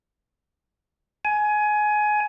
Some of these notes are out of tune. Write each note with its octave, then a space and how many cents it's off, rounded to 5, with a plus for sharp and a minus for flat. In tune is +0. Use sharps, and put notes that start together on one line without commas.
G#5 +20